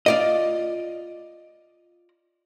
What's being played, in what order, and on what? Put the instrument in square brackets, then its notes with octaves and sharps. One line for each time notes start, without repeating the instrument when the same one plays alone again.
[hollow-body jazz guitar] F4 D5 D#5